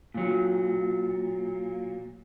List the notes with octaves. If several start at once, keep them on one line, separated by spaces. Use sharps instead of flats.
A#2 F#3